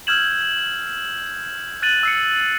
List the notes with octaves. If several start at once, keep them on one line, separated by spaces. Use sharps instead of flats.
E6 F6 G6 G#6 E7 F#7
F#6 A6 D#7 F#7
E6 C7 C#7